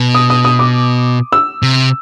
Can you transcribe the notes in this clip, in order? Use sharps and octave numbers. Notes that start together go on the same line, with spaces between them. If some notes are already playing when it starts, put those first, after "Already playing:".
Already playing: B2
D#6
D#6
D#6
D6
E6
C3